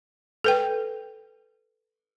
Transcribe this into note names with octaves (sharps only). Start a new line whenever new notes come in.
A4 B4 G5